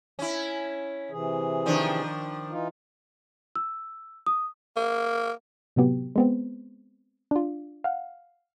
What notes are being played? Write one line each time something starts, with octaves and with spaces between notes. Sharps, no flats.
C#4 E4
C3 E3 G#4
D#3 F3 D4
E3 D#4 F4
E6
D#6
A#3
A2 C3 F#3 B3 G4
G#3 B3 C4
D4 F4
F5 F#5